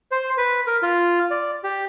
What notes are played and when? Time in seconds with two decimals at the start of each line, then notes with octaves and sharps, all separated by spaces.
0.12 C5
0.37 B4
0.67 A#4
0.83 F4
1.31 D5
1.64 G4